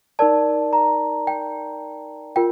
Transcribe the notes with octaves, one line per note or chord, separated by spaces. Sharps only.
D#4 A#4 D5 A5
A#5
G5
F4 A#4 G5